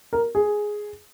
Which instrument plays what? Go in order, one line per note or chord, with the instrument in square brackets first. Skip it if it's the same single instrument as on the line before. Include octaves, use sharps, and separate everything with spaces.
[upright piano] A#4
G#4